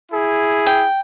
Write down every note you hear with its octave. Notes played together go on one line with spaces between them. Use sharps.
E4 G#4
G5